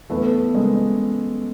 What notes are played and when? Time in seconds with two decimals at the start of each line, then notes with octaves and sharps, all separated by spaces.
0.10 E2 A3 B3
0.32 E2
0.54 C#3 G#3 A#3